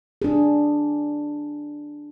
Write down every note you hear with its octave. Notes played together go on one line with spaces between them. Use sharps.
D4 G#4